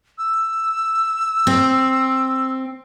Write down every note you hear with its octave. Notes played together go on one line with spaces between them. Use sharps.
E6
C4